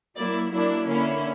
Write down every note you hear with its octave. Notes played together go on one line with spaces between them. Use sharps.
F#3 A#3 E4 D5
F#3 A#3 D4 E4
D3 A#3 C#4 E4